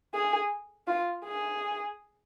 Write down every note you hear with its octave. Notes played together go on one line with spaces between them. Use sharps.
G#4
F4
G#4